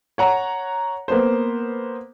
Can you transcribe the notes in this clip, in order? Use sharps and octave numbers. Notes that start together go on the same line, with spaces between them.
C#5 F#5 A#5
A#3 B3 C5